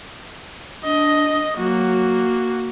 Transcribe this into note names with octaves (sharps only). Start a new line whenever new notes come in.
D4 D#5
F#3 A#3 F#4